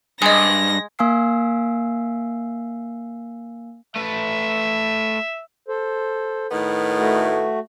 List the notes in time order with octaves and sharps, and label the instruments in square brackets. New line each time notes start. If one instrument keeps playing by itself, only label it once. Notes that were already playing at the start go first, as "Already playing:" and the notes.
[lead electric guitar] G2 [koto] G#3 [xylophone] D#5 D#6 [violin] A#6
[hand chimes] A#3 F5 G#5 E6 C7
[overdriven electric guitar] A3 B4 [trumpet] E5
[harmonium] A4 C5
[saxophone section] A2 D#3 B3
[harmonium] A3 F#4